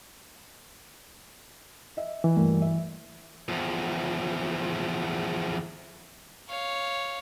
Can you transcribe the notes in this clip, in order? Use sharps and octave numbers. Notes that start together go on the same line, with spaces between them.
D#5 E5
E3
D2 G2 A#3
E5
E2 F3
C#5 F5